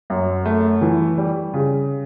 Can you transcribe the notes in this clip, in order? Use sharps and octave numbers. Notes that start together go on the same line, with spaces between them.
F#2
A3
E3
G3
C#3